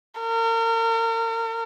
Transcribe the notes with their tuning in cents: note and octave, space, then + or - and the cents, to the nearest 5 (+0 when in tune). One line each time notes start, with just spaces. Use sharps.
A#4 -35